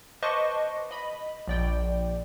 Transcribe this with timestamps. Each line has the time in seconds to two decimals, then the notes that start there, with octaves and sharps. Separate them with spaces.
0.22 B4 C5 D#5 A5 C#6 D6
0.91 D#5 B5
1.48 A#1 D5 G5